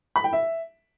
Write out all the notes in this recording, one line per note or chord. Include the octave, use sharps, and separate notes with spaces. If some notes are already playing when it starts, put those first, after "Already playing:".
B5
G5
E5